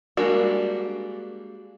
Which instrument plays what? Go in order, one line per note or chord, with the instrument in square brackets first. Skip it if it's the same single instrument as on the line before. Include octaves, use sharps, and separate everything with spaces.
[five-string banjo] G3 G#3 A#3 D4 F#4